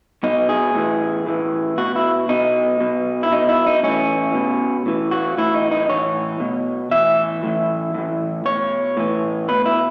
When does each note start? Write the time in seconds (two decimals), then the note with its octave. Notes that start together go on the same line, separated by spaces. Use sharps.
0.24 B2 D#4
0.49 G#4
0.75 A2 E3
1.26 A2 E3
1.78 B2 F#4
1.96 E4
2.29 B2 D#4
2.81 B2
3.23 E4
3.32 B2 D#4
3.49 E4
3.67 D#4
3.83 A2 E3 C#4
4.35 B2
4.86 A2 E3
5.11 F#4
5.37 A2 E3 E4
5.54 D#4
5.71 D#4
5.89 A2 E3 C#5
6.40 B2
6.91 A2 E3 E5
7.43 A2 E3
7.94 A2 E3
8.45 B2 C#5
8.97 A2 E3
9.48 B2 B4
9.65 E4